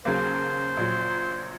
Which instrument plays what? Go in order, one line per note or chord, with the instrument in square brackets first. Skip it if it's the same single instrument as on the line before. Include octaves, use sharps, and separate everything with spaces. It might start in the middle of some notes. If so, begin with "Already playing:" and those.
[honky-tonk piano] D#2 C#3 F#3 A#3 [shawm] C5
[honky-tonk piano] A#1 A#2 F#3